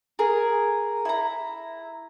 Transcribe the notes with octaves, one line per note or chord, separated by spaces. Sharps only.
G#4 A#4
E4 A#5